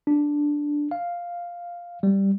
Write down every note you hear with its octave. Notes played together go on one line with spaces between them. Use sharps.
D4
F5
G3